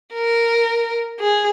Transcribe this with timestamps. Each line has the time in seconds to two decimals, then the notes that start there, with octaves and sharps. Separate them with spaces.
0.14 A#4
1.20 G#4